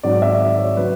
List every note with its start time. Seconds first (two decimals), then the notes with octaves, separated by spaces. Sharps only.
0.03 G#1 G#2 F#3 D5
0.22 E5
0.41 D5
0.59 C#5
0.77 C#3 F#3 B4